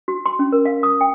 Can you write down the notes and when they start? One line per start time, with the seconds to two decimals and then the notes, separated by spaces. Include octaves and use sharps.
0.08 F#4
0.26 C6
0.39 C#4
0.52 A#4
0.65 F5
0.83 D#6
1.01 G5